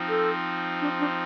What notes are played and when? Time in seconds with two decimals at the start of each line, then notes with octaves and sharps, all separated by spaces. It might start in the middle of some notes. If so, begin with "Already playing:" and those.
Already playing: F3 C4 D#4
0.09 A4
0.81 D4
0.99 D4